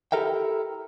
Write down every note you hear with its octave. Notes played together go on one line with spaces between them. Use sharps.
E4 G4 A4 A#4 E5 G5